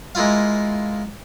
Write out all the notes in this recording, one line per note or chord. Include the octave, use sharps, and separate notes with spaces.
G#3 A#3 E4 F4 F5